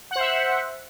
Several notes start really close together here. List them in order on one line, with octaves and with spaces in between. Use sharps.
F#5 C5 E5